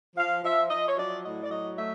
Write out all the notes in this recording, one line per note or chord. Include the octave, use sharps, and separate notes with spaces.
F3 F5
F3 E5
F3 D#5
C#5
F#3 D5
A2 D#5
D5
F#3 D#5
A3 E5